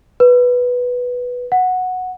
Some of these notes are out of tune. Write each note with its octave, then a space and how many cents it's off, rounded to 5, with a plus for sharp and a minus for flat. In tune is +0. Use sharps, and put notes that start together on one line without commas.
B4 -5
F#5 -10